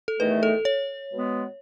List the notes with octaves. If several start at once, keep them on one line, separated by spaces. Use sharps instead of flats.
A4
E2 D#3 A3 B4
A4
C#5
B2 G#3 B3